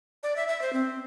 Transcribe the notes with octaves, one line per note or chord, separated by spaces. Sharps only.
D5
E5
E5
C5
C4